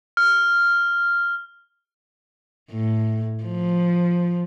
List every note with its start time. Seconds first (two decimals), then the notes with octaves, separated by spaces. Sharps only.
0.17 F6
2.71 A2
3.44 F3